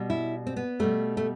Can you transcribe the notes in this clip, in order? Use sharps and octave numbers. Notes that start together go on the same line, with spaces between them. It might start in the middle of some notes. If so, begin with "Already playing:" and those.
Already playing: B2 G3
E4
C4
B3
B2 G3 A3
A3